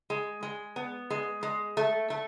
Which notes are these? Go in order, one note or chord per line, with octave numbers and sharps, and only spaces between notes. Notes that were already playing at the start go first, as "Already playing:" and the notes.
G#3
G#3
B3
G#3
G#3
A3
A3